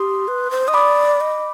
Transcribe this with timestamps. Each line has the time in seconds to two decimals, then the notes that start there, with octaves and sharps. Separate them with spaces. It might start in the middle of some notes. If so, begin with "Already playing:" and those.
Already playing: G4 C6 D#6
0.28 B4
0.51 C5
0.68 D#5 D#6
0.74 D5 B5 D6
1.21 D#5